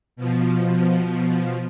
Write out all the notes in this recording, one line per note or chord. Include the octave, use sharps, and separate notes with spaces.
B2 F3